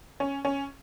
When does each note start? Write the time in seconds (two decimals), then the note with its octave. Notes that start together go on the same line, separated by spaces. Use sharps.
0.20 C#4
0.45 C#4